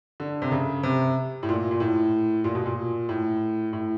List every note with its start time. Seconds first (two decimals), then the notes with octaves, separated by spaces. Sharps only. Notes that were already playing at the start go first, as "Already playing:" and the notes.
0.20 D3
0.42 C3
0.52 C#3
0.83 C3
1.43 A2
1.49 A#2
1.71 A#2
1.80 A2
2.44 A#2
2.55 B2
2.66 A#2
3.09 A2
3.73 A2